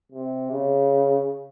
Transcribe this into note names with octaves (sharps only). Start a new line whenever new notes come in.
C3
C#3